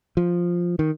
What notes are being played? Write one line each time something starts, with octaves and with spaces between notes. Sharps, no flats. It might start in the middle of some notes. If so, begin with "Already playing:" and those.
F3
D#3